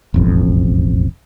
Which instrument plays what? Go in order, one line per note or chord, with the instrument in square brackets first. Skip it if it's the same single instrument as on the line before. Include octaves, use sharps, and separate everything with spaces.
[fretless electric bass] E1 A1 F2